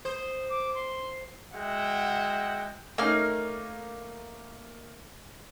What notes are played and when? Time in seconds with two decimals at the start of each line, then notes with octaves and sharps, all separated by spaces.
0.05 C5 D#6
0.50 D6
0.75 C6
1.53 G#3 F#4 E5 F#5 G5
2.98 A3 A#3 C#4 D#4 F6